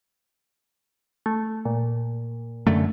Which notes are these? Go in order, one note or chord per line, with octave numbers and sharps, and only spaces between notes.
A3
A#2
F#2 D3 A3